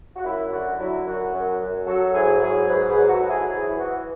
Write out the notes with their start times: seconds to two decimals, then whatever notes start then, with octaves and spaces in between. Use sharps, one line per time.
0.16 F#4
0.23 F#2 E4
0.51 D3 F#4
0.78 F#3 E4
1.06 F#2 F#4
1.32 F#2
1.60 F#2
1.86 F#3 F#4 A4
2.13 G#2 E4 G#4
2.41 F#3 E4 G#4
2.68 G#2 G#4 B4
2.88 G#4 B4
2.95 F#3
3.08 F#4 A4
3.22 G#2
3.29 E4 G#4
3.49 E3 E4 G#4
3.67 E4
3.76 E3 F#4